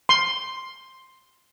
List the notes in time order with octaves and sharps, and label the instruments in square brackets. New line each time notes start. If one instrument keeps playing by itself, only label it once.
[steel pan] C6